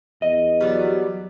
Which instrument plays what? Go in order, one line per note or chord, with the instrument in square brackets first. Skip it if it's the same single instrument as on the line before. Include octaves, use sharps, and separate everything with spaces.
[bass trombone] E2 [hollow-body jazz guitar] D#5
[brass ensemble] F#3 [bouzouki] G3 B3 D5